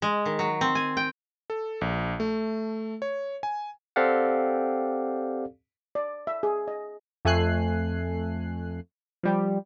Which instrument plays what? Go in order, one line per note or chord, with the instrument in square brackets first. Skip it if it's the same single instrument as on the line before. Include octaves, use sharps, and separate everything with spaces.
[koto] G#3
D#3
F#3
C4
G#5
G5
[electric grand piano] A4
A#1
A3
C#5
G#5
[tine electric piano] C4 G4 A4 D5 F5 F#5
[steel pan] D5
E5
G#4
D#5
[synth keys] F2 A3 A4 G#5 F#6 C7
F3 G3 G4